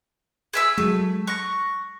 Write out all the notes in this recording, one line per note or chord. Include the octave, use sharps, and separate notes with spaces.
G#4 E5 E6
F#3 G#3 A3
C#6 F#6 A#6